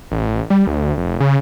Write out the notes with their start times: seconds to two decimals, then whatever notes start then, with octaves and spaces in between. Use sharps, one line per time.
0.11 A1
0.50 G3
0.67 D2
0.98 F1
1.20 C#3